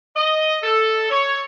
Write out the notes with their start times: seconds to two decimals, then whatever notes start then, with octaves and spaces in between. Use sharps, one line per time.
0.16 D#5
0.62 A4
1.09 C#5